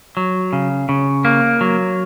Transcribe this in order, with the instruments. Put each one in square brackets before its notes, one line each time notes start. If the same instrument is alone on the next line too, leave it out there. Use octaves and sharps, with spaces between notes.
[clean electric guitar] F#3
C#3
C#3
A#3
F#3